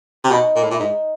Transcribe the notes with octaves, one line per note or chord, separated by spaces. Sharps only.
C3
B2 D#4
A#2
A2
A#2
E4
G#2 D#4